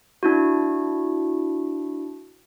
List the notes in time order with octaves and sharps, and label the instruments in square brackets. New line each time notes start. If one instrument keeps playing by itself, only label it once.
[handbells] D4 E4 F#4